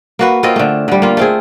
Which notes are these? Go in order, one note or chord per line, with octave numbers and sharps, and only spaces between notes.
A#3 F#4 B4
A#3 C4 F4 D#5
D3 A3
D3 G3
A#3 F4
A3 C4 G#4